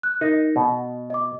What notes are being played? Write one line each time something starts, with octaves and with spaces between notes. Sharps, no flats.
F#6
D#4 A#4 A#6
B2 F#4
D#5 D6